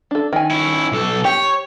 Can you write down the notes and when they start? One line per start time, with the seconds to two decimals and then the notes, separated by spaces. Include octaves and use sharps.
0.11 D4 A4
0.33 D#3 G#5
0.51 C#4 E4
0.92 B1 A4
1.25 G4 C#5